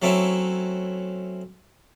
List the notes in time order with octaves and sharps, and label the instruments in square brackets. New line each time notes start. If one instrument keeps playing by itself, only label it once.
[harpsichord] F#3 A3 C4 C#4 E4